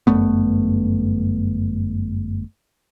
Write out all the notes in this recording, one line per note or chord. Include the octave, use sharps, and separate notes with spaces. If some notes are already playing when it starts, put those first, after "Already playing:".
G1 F#2 A3 B3